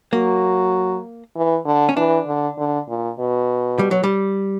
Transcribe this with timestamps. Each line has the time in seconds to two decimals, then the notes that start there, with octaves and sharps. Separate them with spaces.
0.13 F#3 A#3
1.36 E3
1.66 D3
1.89 C#4
1.97 E3 D4
2.27 D3
2.58 D3
2.89 A#2
3.19 B2
3.79 G3
3.91 F#3
4.04 G3